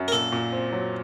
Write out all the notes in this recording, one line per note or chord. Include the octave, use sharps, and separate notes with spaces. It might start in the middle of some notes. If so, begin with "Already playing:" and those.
Already playing: F#2
A#4
A#2 A4
A#2
C4
F#3